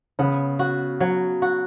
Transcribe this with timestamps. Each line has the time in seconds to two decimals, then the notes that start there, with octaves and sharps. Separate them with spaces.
0.19 C#3 B3
0.59 F#4
1.00 F#3
1.42 F#4